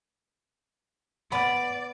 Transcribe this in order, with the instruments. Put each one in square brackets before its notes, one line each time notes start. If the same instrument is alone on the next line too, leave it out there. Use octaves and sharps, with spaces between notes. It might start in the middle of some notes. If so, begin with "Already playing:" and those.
[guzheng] B3 [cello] D5 [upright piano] B5 A6